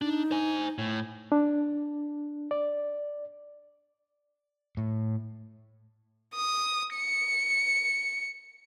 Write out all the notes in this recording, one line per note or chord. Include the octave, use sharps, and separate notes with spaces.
D4 D#4
C5 G#5
A2
D4
D5
A2
D#6
C#7